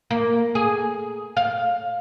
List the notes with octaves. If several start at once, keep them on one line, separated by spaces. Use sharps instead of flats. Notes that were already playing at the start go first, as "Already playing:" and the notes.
A#3
G#4
F5